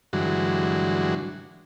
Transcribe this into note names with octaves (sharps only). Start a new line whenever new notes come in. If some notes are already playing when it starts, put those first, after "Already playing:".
G2 D3 E3 F#3 G#3 F#4